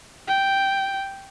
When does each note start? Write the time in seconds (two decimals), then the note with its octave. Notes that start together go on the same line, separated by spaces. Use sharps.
0.28 G5